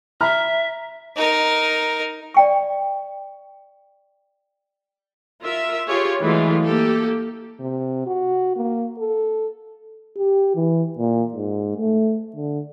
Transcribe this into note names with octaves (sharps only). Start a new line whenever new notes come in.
E5 A#5 F6
D#4 A#4
D5 G5 C#6
F4 A#4 E5
F4 G4 G#4 C#5
E3 F#3 G#3 A3 F4
A#3 G4 A4
C3
F#4
A#3
A4
G4
E3
A#2
G#2
A3
D3